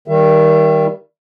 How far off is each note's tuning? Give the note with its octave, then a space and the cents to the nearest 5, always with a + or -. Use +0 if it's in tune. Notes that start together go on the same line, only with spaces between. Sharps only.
D#3 +10 G3 -5 E5 +30